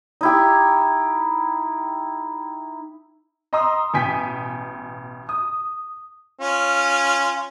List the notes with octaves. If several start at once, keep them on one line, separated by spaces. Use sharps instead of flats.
D#4 E4 G4
D#5 A#5 C6 D#6 E6
A1 B2 G5 G#5 B6
D#6
C#4 F4